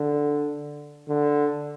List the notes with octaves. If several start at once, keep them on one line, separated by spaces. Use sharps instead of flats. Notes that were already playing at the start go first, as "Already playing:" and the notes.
Already playing: D3
D3